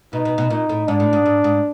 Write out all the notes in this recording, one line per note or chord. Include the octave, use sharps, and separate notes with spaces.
B2 D#4
B2
B2
A#2 D#4
A2
G#2 D4
A2
G#2
G#2
G#2